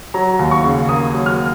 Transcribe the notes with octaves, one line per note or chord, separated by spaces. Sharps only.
F#3 A#5
D#2
C#6
C#3
A#3 D#6
F#3
F6